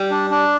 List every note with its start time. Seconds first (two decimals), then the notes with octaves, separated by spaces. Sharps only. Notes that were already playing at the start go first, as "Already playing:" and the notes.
Already playing: G3
0.11 D4
0.30 D4